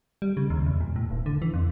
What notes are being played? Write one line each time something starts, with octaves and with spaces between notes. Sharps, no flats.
G3
C#3
D#2
E2
A#2
A2
D#1
D3
E3
F2